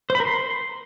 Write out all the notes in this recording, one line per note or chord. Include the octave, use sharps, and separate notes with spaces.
C5
B5
A#4
C6